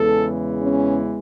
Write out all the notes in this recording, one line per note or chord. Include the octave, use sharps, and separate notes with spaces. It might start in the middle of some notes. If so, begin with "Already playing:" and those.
Already playing: E2 C#3 E3 G#3 A4
C#4